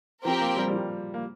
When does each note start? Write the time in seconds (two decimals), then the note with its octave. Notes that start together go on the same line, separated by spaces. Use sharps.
0.24 F3 C4 G4 A#4 G5
0.41 A#3
0.56 G3
0.67 G3
0.73 F3
1.14 A#3